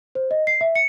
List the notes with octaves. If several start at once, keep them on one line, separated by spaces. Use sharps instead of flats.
C5
D#5
C7
E5
C#7